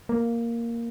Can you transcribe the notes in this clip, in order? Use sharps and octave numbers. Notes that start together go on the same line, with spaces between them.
A#3